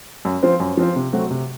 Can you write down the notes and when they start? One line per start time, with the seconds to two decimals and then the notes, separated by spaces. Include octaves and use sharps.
0.25 F#2
0.43 F3 C4 F4 C5
0.60 F#2
0.77 F3 C4 F4 C5
0.96 C3
1.13 F#3 A3 C4 F#4
1.31 C3